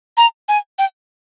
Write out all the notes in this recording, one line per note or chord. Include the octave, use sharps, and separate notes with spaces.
A#5
G#5
G5